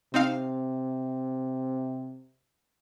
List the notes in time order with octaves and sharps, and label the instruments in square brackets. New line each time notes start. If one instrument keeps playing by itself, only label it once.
[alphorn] C3 [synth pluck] C4 D#4 F5